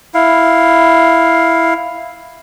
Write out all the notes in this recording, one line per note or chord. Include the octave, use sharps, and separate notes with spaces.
E4 F5